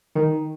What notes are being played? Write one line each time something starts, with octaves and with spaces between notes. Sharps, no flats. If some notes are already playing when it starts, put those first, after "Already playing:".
D#3